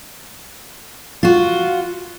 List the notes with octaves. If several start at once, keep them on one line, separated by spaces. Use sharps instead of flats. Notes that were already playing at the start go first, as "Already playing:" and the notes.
F4 F#4